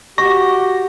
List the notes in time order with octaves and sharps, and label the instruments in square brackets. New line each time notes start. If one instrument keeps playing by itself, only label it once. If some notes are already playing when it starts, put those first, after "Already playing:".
[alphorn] F#4 [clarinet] G4 [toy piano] C#6 [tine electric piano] A#6